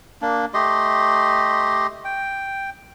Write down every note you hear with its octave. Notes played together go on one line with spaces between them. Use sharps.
A#3 D4
A3 G4 D#5 C6
G5